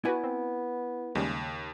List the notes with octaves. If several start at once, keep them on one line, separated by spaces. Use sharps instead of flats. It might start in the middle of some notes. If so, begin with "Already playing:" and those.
B3 E4 F#4 B4 D5 G#5
C4
D#2 C#3 G3 G#3